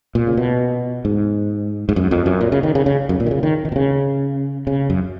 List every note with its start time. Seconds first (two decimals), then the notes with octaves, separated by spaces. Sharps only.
0.15 A#2
0.27 C#3
0.37 B2
1.05 G#2
1.89 G#2
1.96 F#2
2.11 F2
2.26 F#2
2.41 A#2
2.52 C#3
2.63 D#3
2.75 C#3
2.86 C#3
3.09 F#2
3.20 A#2
3.27 D#3
3.31 C#3
3.43 D#3
3.65 D#3
3.72 B2
3.76 C#3
4.67 C#3
4.90 F#2